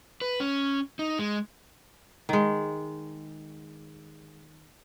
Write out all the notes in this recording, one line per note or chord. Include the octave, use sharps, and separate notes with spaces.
B4
C#4
D#4
G#3
D#3 G#3